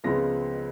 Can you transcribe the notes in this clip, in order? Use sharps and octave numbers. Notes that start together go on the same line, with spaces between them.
C#2 C#3 F3 G#3 B3 A#6